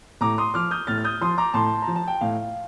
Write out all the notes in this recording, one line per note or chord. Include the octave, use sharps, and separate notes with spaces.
A2 A#5 D6
C6 D#6
F3 D6 F6
D#6 G6
A2 F6 A6
F6
D#6 G6
F3 C6 D#6
A#5 D6
A2 A5 C6
A#5
F3
A5
G5
A2 F5